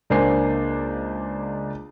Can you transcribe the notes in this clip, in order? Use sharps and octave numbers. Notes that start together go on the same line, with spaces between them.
C#2 A#3 D4 C5 G#5 C7